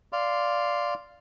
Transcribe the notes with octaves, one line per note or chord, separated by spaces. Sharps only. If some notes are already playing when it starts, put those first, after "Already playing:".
D5 F5 C6